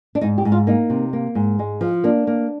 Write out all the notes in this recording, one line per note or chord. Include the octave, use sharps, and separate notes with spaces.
D4
G#2 D#4
G4
G#2
F4
A#3 D#4
C3
A#3
G#2
G#3
F3
A#3 D4
A#3